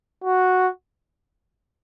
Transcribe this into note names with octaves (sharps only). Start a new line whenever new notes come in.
F#4